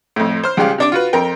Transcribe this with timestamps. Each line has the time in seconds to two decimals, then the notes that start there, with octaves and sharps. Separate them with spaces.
0.16 F2 A2
0.44 C5 F6
0.57 C#2 C#3 G3 G4 F5
0.78 C3 D4 D6
0.92 F4 F#4 B4
1.13 F2 A#4 G5